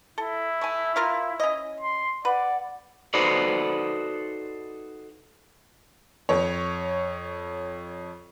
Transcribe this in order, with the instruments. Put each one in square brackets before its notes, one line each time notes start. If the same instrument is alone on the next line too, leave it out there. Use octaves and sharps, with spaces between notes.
[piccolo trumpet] E4 [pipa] A4
[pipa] A3 G#5
F4 A#4 F5
C#4 D#5
[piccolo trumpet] C6
[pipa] B4 [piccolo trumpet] D5 [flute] F#5
[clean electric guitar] D#4 F#4 A4 B4 C5 D5
[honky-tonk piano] F2 C#5